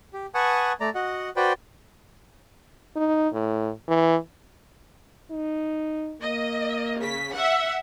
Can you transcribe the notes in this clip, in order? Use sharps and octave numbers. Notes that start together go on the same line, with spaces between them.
G4
B4 F#5 G#5 A5 C#6 D#6
A3 D5 A#5
F#4 D#5 F#5
F#4 B4 C5 D5 G5
D#4
A2
E3
D#4
A#3 D#5
C#3 B6
E5 F#5